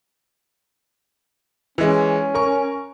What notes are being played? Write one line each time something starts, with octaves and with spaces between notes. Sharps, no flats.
E3 G#3 C#4
A#4 C#6